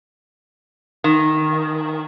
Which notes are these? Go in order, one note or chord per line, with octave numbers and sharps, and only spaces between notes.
D#3